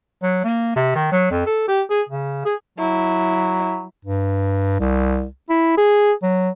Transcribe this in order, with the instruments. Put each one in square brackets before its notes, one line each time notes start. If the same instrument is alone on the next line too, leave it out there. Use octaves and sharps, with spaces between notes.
[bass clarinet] F#3
A#3
C3
D#3
F#3
F2
A4
G4
G#4
C#3
G#4
[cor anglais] F#3 [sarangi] E4
[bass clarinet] G2
C2
E4
G#4
F#3